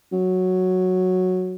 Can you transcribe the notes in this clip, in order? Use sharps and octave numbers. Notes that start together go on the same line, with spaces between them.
F#3